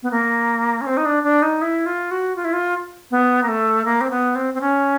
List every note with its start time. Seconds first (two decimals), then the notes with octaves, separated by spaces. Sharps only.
0.03 B3
0.11 A#3
0.81 C#4
0.86 C4
0.97 D#4
1.05 D4
1.23 D4
1.42 D#4
1.62 E4
1.86 F4
2.11 F#4
2.36 F4
2.45 E4
2.53 F4
3.11 B3
3.43 A#3
3.48 A3
3.85 A#3
4.01 C4
4.11 B3
4.35 C4
4.54 C4
4.61 C#4